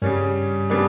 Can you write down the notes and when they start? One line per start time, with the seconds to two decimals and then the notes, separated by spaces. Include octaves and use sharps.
0.02 G2 C#3 G3 C#4
0.70 C#3 G3 B3 D4